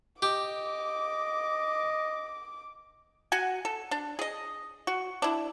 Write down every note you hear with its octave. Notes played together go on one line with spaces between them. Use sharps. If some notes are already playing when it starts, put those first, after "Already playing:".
G4 D#5 D6
F#4 F#5 G#5
A4
D4
G#4 D#5
F#4
D4 E4